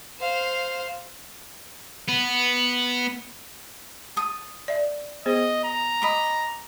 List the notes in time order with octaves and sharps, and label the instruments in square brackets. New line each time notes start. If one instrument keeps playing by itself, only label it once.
[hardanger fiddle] C5 F5
[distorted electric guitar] B3
[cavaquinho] A5 D#6
[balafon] D5 E5
[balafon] B3 G#4 C5 [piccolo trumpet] D#5
[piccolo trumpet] A#5
[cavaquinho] D#5 B5 D6